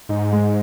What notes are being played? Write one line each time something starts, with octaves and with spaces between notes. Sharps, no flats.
G#2 D#4
G#3